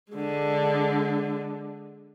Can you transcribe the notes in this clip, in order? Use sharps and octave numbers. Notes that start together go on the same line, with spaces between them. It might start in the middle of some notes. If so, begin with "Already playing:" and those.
D3 G#3